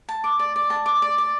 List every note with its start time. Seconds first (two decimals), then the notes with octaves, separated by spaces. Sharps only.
0.09 A5
0.24 D6
0.39 D5
0.56 D5
0.70 A5
0.86 D6
1.02 D5
1.18 D5